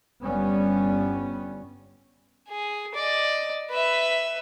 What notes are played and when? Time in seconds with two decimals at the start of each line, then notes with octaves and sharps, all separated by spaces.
0.23 G1 G3 B3 C#4
2.49 G#4
2.94 D5 D#5
3.71 B4 E5